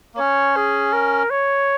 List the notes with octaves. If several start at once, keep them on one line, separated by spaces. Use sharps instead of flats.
A#3
C#4 C#5
G#4
A#4
C#5